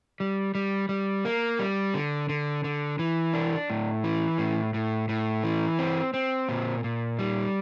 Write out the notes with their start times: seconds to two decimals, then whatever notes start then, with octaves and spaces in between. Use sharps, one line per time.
0.20 G3
0.55 G3
0.89 G3
1.25 A#3
1.59 G3
1.94 D3
2.29 D3
2.64 D3
2.99 E3
3.34 D4
3.70 A2
4.04 E3
4.38 A2
4.74 A2
5.09 A2
5.44 E3
5.79 C4
6.14 C4
6.49 A#2
6.84 A#2
7.19 G3